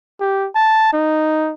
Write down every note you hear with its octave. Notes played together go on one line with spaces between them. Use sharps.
G4
A5
D#4